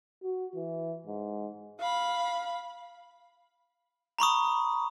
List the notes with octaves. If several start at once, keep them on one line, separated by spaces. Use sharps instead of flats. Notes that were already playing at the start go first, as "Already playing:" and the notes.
F#4
E3
G#2
F5 B5
A#5 B5 C#6 D#6